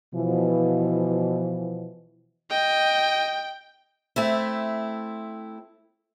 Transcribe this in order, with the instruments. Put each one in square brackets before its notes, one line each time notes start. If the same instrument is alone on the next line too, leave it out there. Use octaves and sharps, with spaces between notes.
[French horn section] B2 E3 F3
[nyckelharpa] D#5 [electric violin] G5
[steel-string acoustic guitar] A3 C4 E4